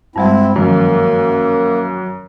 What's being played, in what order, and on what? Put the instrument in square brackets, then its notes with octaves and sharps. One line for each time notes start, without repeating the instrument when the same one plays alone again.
[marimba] G2 G3 G#3 [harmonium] C4 E4
[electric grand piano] F#2 [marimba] D#3 F3 [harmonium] A#3